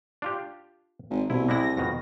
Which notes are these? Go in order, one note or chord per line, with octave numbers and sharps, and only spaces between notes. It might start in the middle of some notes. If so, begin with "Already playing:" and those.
D4 F4 G4
G#1
C2 B2 E4
G3 G#3 E4 A#6
F2 B2 D#3